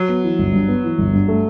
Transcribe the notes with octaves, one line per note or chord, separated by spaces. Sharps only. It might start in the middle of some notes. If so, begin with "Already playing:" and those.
Already playing: F#3
B3
E3
G1
G2
B3
E3
G1
G2
A3